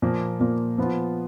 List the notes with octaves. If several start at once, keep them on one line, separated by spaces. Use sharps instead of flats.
A#2 F3 A#3
A#2 F3 A#3
F3 B3 F4